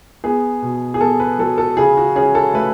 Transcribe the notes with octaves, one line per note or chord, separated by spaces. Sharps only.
B3 G#4
B2
G#4
B3 A4
B4
F#3 A4
A4
C#3 G#4
F#4
C#4 G#4
A4
A3 B4